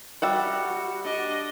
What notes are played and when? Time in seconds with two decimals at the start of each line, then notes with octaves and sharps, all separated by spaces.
0.22 G3 F#4 E5 F#5
1.04 D4 D#5